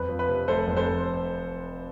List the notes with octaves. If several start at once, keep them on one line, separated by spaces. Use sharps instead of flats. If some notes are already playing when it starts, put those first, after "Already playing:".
Already playing: F2 B4
F3
B4
C3
F1 A4 C5
F2
A4 C5